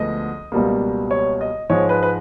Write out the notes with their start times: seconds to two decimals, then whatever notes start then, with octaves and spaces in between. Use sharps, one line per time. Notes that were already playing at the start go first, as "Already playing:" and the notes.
Already playing: D2 D3 F3 G#3 B3 D#5
0.52 C#2 B2 G3 A#3
1.11 C#5
1.41 D#5
1.69 G#2 F3 G#3 C#5
1.89 B4
2.03 B4